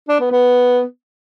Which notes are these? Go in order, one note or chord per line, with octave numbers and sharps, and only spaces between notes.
D4
B3
B3